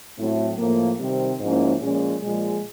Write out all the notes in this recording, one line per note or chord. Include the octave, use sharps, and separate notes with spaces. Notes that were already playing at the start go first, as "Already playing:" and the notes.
A2 F#3 A3 C4 E4
A2 F3 A#3
C3 D#3 G3 C4
G#2 F3 A#3 C#4 E4
A#2 F3 G#3 C#4
A#2 F3 G#3